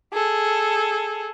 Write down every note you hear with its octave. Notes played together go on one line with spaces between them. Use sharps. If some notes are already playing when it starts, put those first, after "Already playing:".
G#4 A4